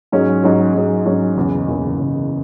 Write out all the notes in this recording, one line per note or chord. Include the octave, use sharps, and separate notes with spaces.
G#2 F#3 C#4 G#4
G#2 F#3 C#4 G#4
G#2 F#3 C#4 G#4
G#2 F#3 C#4 G#4
F#1 E2 C#3
F#1 E2 C#3
F#1 E2 C#3